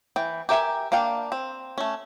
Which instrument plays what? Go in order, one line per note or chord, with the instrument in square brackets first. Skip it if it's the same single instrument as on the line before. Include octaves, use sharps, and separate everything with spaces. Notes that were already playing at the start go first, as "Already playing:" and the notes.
[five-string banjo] E3 G5
G4 A#4 E5 G5 G#5
A#3 D4 F5 G5
C4
A3 C#4